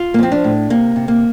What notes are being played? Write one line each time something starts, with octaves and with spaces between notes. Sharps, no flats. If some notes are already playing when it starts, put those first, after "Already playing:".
Already playing: F4
A#3
F3 C4
D4
A2
C3 A#3
C3
A#3